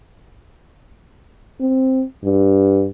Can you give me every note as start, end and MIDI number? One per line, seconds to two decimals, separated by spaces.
1.61 2.04 60
2.24 2.88 43